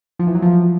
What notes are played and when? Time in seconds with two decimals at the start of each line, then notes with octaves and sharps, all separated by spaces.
0.19 F3
0.27 E3
0.35 F#3
0.42 F3